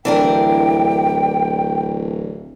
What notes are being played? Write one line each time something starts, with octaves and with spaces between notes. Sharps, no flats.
D1 E3 D4 A#4 G5